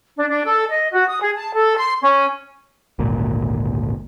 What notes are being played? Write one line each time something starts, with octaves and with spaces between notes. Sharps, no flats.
D4
D4
A4
D#5
F#4
D#6
G#4
A5
A4
C6
C#4
G#1 D2 A#2